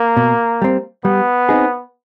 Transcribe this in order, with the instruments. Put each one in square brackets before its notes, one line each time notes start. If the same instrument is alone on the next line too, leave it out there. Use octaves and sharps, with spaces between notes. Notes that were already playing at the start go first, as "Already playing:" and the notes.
Already playing: [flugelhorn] A#3
[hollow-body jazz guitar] B2
G3 C4
[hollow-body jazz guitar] G3 [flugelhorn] B3
[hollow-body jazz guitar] C4 D#4 G#4